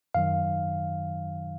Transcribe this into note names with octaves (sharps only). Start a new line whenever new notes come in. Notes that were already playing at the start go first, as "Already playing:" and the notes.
F#2 D#3 F#3 F5